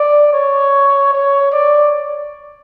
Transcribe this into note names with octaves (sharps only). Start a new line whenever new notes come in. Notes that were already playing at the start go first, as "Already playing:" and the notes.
Already playing: D5
C#5
C#5
D5